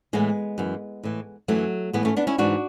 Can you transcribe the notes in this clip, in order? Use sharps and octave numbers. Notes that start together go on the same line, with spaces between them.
A2 E3 G#3 B3
F#2 E3
A2 E3
F#2 E3 F#3 A3
A2 E3 G#3 B3
A3 C#4
B3 D4
C#4 E4
G#2 E3 D4 F#4